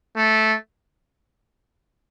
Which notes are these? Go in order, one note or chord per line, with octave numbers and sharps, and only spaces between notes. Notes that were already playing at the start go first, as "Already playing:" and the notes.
A3